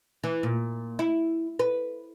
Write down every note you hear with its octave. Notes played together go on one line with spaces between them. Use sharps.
E3
A#2
E4
B4